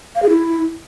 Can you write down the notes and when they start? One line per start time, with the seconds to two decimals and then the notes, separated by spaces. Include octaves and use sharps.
0.15 F5
0.22 G#4
0.30 E4